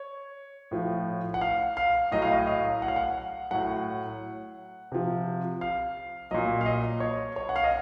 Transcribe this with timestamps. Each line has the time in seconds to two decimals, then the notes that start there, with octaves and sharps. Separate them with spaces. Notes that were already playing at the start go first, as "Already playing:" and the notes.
Already playing: C#5
0.71 A2 F3
1.34 F#5
1.41 F5
1.77 F5
2.12 A2 F#3 D#5
2.22 F5
2.32 D#5
2.47 F5
2.82 F#5
2.88 F5
2.96 F#5
3.51 A2 F#3 F#5
4.92 C3 F3
5.61 F5
6.31 A#2 F#3 D#5
6.61 F5
6.66 D#5
7.00 C#5
7.36 C#5
7.49 F#5
7.56 F5
7.64 D#5